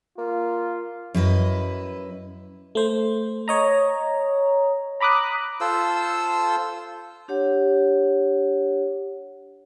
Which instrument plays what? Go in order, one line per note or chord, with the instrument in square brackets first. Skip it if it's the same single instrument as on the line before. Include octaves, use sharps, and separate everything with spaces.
[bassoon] A#3 [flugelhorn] F4
[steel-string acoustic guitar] F#2 E4 B4 D#5
[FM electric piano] A3 C5
C#5 D#5 A#5
A#5 B5 D6 D#6 F#6
[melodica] F4 A4 C5 E6
[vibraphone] D4 G4 C#5 F#5